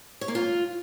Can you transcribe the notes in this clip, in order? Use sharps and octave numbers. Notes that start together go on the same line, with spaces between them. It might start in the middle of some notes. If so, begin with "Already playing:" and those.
C#5
A#3
F4